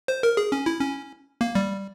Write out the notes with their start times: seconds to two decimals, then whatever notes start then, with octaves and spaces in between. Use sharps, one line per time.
0.08 C5
0.23 A#4
0.37 G#4
0.52 C#4
0.66 E4
0.80 C#4
1.41 A#3
1.55 G3